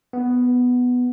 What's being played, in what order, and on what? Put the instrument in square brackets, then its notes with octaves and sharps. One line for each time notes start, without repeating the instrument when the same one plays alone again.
[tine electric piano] B3